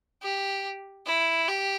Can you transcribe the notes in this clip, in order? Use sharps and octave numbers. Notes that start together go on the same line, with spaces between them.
G4
E4
G4